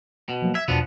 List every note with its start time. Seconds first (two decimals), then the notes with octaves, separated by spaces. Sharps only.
0.29 B2
0.42 F3 F#3 A#3
0.55 E5 G#6
0.68 E2 B2 F3 B3 D4